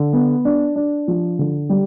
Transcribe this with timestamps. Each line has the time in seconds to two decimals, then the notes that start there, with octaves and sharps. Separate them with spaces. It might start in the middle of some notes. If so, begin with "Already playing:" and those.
Already playing: D3
0.13 B3
0.45 D4
0.76 D4
1.08 F3
1.39 D3
1.69 G3